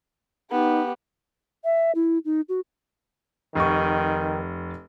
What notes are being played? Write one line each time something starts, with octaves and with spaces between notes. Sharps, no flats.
B3 D#4 G4
E5
E4
D#4
F#4
F1 D#3 C#6